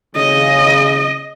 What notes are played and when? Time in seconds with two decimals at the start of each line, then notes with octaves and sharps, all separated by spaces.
0.16 C#3 D#5